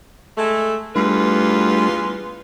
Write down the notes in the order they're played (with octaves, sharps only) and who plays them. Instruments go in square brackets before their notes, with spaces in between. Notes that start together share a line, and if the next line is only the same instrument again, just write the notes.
[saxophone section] G#3 A3
[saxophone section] E2 F4 B4 [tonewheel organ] G3 A3 D4